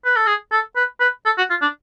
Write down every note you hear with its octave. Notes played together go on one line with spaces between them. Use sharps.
B4
A4
G#4
A4
B4
B4
A4
F#4
F4
D4